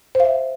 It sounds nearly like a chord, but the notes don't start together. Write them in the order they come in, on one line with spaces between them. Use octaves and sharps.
C5 F5 E5